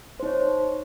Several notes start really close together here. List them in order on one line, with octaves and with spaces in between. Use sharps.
C5 D#4 C#5